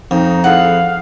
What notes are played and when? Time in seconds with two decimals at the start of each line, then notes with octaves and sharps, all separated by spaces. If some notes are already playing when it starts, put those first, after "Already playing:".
0.11 F2 D#4
0.44 E4 G#4 A4 F5 F#5